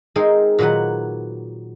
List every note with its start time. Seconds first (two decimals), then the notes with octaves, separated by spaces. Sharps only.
0.16 G#3 C4 D#4 G#4 A#4 C5
0.59 A#2 D#3 F#3 B4 F#5